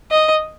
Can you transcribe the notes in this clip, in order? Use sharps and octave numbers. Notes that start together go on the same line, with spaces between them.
D#5